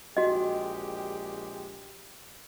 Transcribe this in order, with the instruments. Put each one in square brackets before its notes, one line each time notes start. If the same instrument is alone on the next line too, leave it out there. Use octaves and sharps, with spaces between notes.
[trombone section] A#1 G#3 G4 [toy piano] F#4 D#5